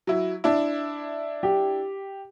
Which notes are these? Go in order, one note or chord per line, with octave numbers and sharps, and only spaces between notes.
F#3 E4
D4 E4
G4